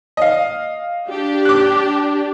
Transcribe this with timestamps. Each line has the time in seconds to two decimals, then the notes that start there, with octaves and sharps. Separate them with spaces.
0.17 D#5 F5
1.10 D4 G4
1.45 D6 F#6